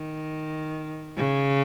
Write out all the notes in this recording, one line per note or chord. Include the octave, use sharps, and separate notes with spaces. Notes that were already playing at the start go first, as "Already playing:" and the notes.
Already playing: D#3
C#3